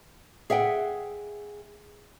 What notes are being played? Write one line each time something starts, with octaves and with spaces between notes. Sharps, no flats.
G#4 E5 F#5 G5